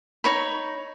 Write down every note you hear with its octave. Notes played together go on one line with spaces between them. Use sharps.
D#4 C#5 B5